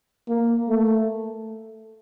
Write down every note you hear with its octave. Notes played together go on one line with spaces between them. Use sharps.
A#3
A3